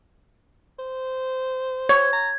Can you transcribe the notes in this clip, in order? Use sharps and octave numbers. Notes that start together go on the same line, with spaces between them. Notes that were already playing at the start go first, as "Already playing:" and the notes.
C5
C#5 G#6
A#5